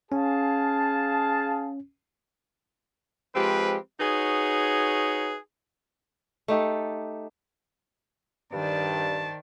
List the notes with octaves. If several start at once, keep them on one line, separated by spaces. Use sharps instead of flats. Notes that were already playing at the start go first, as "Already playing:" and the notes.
C#4 G#4 F5 A5
F3 G#3 C4 G4 B4
D#4 F#4 G#4 B4 C#5
A3 D#4 G4 A4
G2 D#3 C5 D5 A5